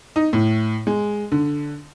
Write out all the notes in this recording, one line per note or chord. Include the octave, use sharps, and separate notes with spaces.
D#4
A2
G#3
D3